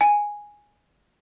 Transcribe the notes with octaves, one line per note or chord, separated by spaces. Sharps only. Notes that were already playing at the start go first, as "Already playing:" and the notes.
G#5